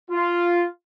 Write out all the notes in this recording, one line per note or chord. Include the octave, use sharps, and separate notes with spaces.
F4